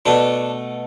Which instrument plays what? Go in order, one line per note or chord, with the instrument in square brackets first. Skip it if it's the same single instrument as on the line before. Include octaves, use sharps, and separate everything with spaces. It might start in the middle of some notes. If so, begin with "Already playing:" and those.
[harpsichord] B2 A3 D4